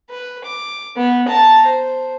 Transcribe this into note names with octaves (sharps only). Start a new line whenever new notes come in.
B4
D6
B3
A5 A#5
C5